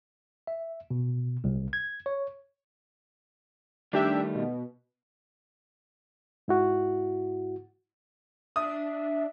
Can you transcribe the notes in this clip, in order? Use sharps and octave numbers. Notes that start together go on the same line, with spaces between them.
E5
B2
C2
G#6
C#5
D#3 G3 A3 D4 G4 E5
B2
G#2 E4 F#4
D4 E5 D#6